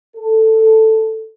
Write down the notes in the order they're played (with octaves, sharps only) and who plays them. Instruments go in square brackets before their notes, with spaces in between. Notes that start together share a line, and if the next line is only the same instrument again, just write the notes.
[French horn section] A4